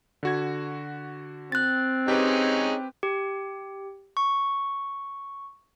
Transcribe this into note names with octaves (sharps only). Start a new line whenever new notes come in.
D3 F#4 G#6
C4 F#6 A6
C#4 D#4 G4 G#4 B4 G5
G4
C#6